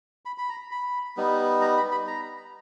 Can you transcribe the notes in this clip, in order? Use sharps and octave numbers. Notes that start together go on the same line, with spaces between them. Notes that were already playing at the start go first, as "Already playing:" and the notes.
B5
B5
A#5
B5
G3 B3 D#4
A#5
B5
B5
A#5